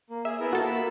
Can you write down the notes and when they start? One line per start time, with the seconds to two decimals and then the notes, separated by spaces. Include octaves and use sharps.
0.10 A#3
0.25 G#4 E5
0.40 B3 E4 A#4
0.53 A#3 F#4 A4
0.66 A#3 B5 E6